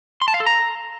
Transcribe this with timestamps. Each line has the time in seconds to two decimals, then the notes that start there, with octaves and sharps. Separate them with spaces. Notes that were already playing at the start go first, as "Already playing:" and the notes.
0.22 C6
0.28 A5
0.34 F5
0.40 A4
0.46 A#5